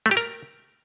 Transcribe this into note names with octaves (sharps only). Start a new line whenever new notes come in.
A3
G4
A#4